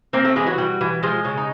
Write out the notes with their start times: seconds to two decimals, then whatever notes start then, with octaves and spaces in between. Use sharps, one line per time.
0.13 A#3 C4 A#4
0.25 A3 A4
0.36 E3 G#3 G#4
0.47 F#3 F#4
0.58 G3
0.81 E3
1.03 F3 G#3 F4
1.24 C#3 C#4
1.37 D#4